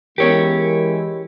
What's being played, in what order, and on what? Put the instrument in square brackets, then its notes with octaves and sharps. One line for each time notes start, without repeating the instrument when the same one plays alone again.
[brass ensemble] E3 G#3 E4 [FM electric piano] B3 C#4 A#4 [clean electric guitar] G4 C#5